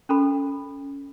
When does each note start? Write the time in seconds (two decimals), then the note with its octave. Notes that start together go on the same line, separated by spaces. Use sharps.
0.09 C#4 A4 B5